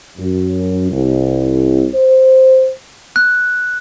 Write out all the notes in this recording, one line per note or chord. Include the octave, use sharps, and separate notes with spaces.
F#2
C2
C5
F#6